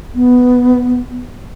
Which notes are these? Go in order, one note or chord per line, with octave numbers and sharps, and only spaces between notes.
B3